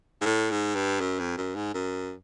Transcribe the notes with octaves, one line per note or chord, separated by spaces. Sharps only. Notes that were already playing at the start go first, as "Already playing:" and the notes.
G#2
A2
G#2
G2
F#2
F2
F#2
G#2
F#2